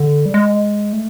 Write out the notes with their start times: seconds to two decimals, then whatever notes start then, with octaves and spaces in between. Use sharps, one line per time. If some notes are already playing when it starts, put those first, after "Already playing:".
Already playing: D3
0.26 G3
0.34 G#3
0.93 A3